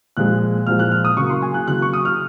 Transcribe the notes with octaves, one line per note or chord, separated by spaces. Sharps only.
A#2 F3 G#3 F#6
A#2 F3 G#3 F6
F#6
F6
D#6
C#3 F#3 A#3 C#6
C6
G#5
F#6
C#3 F#3 A#3 F#6
C#6
D#6
F6